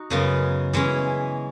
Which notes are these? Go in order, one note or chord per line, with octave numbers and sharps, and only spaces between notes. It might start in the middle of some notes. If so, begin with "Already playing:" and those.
Already playing: D#4 F#4
F#2 C#3 G#3 B3
E3 G#3 C#4